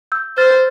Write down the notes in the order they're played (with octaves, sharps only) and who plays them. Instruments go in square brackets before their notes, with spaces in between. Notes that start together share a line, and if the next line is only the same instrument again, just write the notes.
[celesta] E6 G6
[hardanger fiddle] C5 [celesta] F6 A6